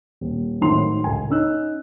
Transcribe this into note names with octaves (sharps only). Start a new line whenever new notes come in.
D#1
G#1 A2 D#3 F#3 C6 F7
C#2 G#5
C#4 D#4 E6 F#6